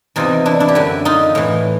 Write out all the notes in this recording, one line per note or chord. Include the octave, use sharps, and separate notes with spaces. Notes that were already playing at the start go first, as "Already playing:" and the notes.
E2 C3 E3 D#4 F4
D4 E4
D4 E4
G4
F#2 D3 E4 F#4
D#4 F4
A2 E3